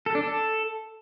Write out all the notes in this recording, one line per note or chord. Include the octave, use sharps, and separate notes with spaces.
A4
D4
A4